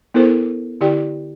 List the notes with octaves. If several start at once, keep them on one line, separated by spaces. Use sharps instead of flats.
B3 E4 A4 A#4 C5
D3 E4 G4 D5 G5